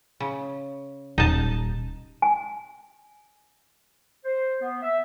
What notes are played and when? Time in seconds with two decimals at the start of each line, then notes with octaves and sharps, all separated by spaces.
0.20 C#3
1.18 D#1 D#4 A5
2.22 G#5
4.25 C5
4.61 B3
4.82 E5